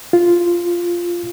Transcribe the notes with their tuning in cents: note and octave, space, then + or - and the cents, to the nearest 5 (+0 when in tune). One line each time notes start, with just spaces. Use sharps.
F4 -5